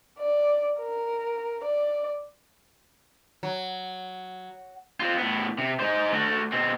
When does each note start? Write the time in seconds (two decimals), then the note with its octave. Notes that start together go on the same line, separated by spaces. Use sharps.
0.19 D5
0.79 A#4
1.64 D5
3.43 F#3
5.00 C4 F4
5.18 A2 B3
5.58 C3
5.80 D#4 C5
6.13 A3 F#4
6.52 B2 C4